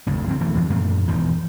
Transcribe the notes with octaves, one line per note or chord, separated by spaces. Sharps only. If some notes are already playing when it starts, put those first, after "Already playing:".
F1 D2 G2
E2 D3 F#3 C4
E1 E3 A3
E2
F#2 A#2 A3
E1 E2 D#3 F3